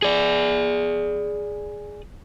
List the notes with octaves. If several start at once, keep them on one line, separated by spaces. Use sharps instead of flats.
G#4 D5